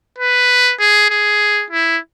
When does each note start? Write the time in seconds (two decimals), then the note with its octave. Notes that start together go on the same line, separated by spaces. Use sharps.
0.18 B4
0.80 G#4
1.10 G#4
1.70 E4